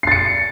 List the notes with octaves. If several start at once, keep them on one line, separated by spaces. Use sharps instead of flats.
A6 C7 C#7